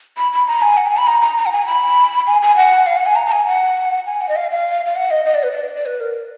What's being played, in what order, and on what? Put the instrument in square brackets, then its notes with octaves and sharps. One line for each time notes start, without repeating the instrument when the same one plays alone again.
[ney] B5
B5
A#5
G#5
F#5
G#5
B5
A#5
A#5
A#5
F#5
G#5
B5
G#5
G#5
F#5
F5
F#5
G#5
A#5
A#5
G#5
F#5
G#5
F#5
D#5
F5
F5
F5
F#5
D#5
D#5
D5
B4
D5
D5
B4
A#4